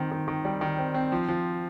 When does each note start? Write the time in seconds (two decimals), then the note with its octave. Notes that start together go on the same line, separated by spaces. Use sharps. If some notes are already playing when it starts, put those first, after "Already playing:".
Already playing: D#3 C4
0.11 D#3
0.28 D#3
0.45 G3
0.61 D#3
0.78 C4
0.94 C4
1.12 F3
1.28 F3